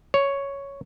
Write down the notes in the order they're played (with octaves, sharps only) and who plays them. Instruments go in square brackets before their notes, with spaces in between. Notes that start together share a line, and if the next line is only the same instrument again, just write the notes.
[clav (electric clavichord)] C#5